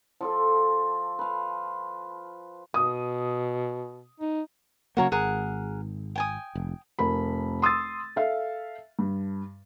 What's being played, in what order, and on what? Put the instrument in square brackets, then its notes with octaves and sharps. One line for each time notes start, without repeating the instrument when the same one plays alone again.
[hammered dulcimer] F3 F4 A4
B4 F5
[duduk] B2 [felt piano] D#6
[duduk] D#4
[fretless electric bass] C#3 F#3 A#3 [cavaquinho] F#4 A#4 C#5
[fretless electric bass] G#1 [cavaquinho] G#4 A#4 F#5
[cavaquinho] G5 G#5 D#6
[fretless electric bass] F1
[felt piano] F1 A#4 B5
C6 D#6 E6 A6
A4 E5 F5
G2